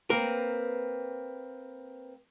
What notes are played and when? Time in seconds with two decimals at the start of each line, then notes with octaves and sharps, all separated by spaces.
0.10 A#3 C4 A#4 B4